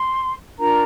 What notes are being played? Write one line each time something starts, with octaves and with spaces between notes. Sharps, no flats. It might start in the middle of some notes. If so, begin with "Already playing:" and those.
Already playing: C6
D4 F4 A#4 A#5